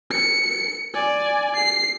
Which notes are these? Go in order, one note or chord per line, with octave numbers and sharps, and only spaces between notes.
C#7
D5 G#5
C7